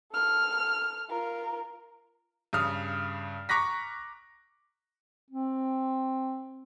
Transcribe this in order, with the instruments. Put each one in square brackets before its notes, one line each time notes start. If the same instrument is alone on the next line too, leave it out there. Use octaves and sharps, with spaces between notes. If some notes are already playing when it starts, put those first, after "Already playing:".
[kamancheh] A4 F6
F4 A#4
[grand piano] G2 C#3 D#6 F6
A#5 C#6 D6 F#6 A#6 B6
[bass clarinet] C4